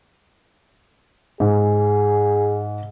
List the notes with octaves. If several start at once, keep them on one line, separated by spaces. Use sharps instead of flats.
G#2 G#4